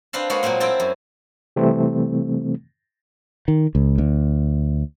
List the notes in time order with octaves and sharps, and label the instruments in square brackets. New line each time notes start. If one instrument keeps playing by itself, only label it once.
[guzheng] C4 D4 B4 F5 A5
G#3 A#3 F#4 B4 C#5 F5
A#2 F#3 G#3 A#3 C4
C4 E4 A#4 G5 A5
F#2
[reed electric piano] C3 E3 G3 A3 C4
[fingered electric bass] D#3
C#2
D2